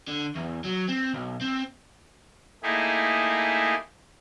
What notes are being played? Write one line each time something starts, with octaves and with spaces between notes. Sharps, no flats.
D3
E2
F#3
C4
B1
C4
A3 A#3 D#4 E4 G4 G#4